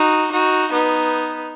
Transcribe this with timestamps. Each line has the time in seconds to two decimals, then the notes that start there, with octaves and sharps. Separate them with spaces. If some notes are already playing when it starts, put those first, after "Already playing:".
Already playing: D#4 F#4
0.31 D#4 F#4
0.71 B3 D#4